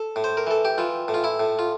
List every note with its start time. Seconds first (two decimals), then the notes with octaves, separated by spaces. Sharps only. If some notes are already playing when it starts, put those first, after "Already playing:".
Already playing: A4
0.16 A2
0.24 C5
0.37 A#4
0.47 E3 A4
0.65 G4
0.78 E3 F4
1.08 A2
1.14 F4
1.24 E4
1.40 A2
1.59 F4